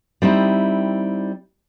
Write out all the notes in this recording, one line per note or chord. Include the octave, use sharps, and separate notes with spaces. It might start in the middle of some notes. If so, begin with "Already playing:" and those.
G3 C4 D#4 E4